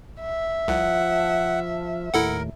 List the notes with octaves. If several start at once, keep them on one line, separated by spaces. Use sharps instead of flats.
E5
C2 F3 F#5
D#2 A2 E4 A4 A#4 F#5